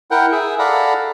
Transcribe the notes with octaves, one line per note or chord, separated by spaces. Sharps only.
E4 A#4 F#5 G5
G#4 E5
A4 D5 F5 F#5 A#5 B5